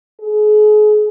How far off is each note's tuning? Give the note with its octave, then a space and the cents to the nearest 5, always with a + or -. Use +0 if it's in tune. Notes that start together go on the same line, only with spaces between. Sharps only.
G#4 +35